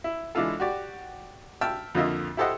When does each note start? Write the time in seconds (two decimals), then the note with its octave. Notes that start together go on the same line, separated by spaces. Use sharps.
0.04 E4
0.35 E3 G#3 D4 E4 F4 A4
0.60 F#4 G4 D5
1.61 E5 G5 A5 E6 F6
1.95 F2 D3 A#3 F4 D#5 E5
2.37 E4 G4 A4 C5 D#5 F#5